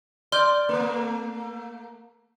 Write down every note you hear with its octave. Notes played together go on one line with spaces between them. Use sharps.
D5 C6 F6 G6
A3 A#3